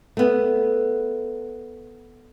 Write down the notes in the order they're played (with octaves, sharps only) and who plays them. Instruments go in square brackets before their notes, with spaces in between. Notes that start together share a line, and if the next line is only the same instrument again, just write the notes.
[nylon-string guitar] A3 B3